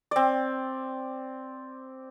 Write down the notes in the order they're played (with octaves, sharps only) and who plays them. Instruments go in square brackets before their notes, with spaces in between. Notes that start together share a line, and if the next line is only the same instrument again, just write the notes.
[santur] C4 D5